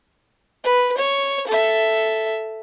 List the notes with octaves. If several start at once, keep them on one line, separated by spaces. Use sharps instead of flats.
B4
C#5
A4 E5